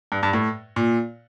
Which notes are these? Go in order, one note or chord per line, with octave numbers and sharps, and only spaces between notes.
G2
G2
A2
A#2